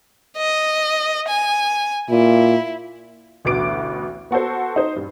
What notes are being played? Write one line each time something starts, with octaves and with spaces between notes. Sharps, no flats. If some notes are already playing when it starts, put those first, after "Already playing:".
D#5
G#5
A#2 E4
A1 D2 B2 B3 D6 D7
B3 F#4 A4 C5
D#4 C5
G2